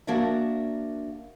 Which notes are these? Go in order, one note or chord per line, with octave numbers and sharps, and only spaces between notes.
A#3 D4 F#4 A#4 D5 E5